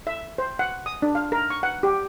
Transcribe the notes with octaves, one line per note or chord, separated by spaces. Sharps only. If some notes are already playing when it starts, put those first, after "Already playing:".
E5
C5
F#5
D#6
D4
F5
A#4
C#6
F#5
G4